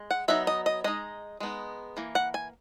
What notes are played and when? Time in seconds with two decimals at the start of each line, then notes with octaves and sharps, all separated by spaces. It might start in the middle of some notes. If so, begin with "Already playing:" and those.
Already playing: G#3
0.11 F#5
0.28 F#3 B3 D#4 E5
0.47 D#5
0.66 D#5
0.84 G#3 D#4 D#5
1.40 G#3 B3 D#4
1.97 E3 A#3
2.15 F#5
2.34 G#5